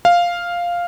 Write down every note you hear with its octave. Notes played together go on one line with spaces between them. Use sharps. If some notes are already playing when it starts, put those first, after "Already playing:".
F5